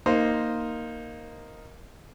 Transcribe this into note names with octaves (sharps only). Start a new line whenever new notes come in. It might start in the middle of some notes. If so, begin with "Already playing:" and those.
A#3 D#4 C5